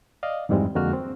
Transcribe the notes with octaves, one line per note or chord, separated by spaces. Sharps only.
D5 D#5 F5
F2 G#2 E3 G3 G#3 C4
F2 D3 G#3 A#3 F#4 F6
C4